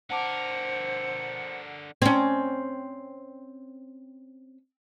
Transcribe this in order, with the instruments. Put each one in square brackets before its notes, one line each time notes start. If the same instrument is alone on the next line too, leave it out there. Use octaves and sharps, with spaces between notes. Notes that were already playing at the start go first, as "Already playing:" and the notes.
[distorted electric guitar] D3 A#4 [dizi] C5 [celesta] F#5 A5 D6 [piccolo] C#7
[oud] C4 C#4